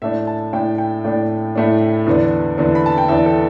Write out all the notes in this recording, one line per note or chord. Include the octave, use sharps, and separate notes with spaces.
A2 A3 D4 E5
A5
A2 A3 D4 G5
G5
A2 A3 D4 D5
A2 A3 D4
E2 D3 B3 D4
E2 D3 B3 D4
B5
A5
G5
E2 D3 B3 D4 E5
A4